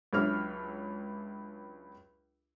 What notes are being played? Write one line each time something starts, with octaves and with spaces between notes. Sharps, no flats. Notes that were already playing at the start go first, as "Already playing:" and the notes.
C#2 F#3 D4 C#5 E5 F6